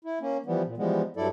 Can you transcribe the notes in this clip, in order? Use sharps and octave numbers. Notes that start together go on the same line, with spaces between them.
E4
A#3 C#4
E3 F3 G3 B3
A#2
E3 F3 G3 G#3 B3
G2 F#3 E4 A4 D5